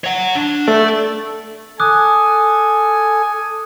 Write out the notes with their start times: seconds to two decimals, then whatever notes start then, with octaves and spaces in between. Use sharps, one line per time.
0.04 C#5 F#5
0.35 D4
0.68 A3 D5
1.80 A4 G#5 D6 D#6 F#6